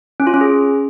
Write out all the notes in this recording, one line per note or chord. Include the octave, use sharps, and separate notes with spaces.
C#4
F4
C#4
G#4